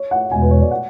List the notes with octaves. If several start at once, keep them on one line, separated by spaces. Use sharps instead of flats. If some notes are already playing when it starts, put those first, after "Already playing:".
Already playing: C#5
F#5
E2 B2 G#3 G#5
B4
C#5
D5
F#5